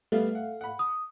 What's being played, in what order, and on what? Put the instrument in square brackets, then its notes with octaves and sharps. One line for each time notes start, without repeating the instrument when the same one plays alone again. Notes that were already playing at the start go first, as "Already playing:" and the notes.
[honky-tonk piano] G3 B3 [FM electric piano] A3 F5
[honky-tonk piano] F#5
F#5 B5
[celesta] D#6